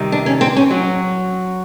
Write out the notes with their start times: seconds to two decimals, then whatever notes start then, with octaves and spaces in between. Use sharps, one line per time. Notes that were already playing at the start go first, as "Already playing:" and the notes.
Already playing: C3 D#3 G3
0.12 D4
0.26 C#4
0.41 C4
0.57 C#4
0.71 F#3